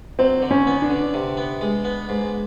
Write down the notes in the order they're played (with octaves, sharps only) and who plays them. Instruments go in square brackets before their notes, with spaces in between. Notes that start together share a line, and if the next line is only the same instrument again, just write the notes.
[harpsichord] F#3 [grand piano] C4
[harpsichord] D3
[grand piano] C#4
[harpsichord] B3
[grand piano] D4
[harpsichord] D3
C3
B3
G#3
B3
G#2